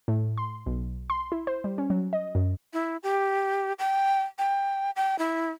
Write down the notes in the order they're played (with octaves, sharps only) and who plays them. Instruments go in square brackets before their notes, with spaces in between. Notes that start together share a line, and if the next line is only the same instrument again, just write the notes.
[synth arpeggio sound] A2
C6
B1
C6
E4
C5
G3
C#4
F#3
D#5
F#2
[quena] E4
G4
G5
G5
G5
E4